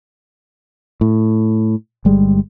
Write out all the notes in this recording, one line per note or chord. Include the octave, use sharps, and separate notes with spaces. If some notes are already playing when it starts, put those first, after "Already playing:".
A2
G1 G3 G#3